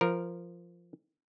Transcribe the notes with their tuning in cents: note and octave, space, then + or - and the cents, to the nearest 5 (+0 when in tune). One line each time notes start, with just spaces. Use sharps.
F3 -10 A#4 +0